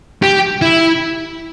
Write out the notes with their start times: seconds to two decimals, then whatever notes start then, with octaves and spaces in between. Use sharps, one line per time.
0.22 G4
0.62 E4